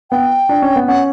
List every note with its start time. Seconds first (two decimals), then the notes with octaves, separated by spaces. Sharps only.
0.11 B3 G5
0.49 D4
0.62 C#4
0.76 B3
0.88 C#4 F#5